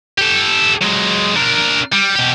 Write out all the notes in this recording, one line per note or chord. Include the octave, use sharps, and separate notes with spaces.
G4 A4
F#3 G#3
D4 A#4
G3
B2 G4